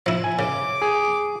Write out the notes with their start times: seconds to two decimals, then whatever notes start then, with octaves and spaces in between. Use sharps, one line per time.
0.06 F3 E4
0.24 G#5
0.39 C#3 D6
0.82 G#4